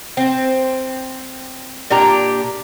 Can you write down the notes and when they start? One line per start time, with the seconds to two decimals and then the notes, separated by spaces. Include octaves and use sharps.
0.17 C4
1.90 A#2 D4 G4 A#5